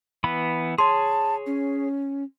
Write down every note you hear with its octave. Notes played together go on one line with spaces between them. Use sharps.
E3 B3 B5
G#4 C#5 A5 C6
C#4